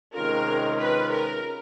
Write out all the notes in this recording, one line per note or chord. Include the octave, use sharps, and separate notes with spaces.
C3 D#3 G#3 C#4 F4 A#4
B4
A#4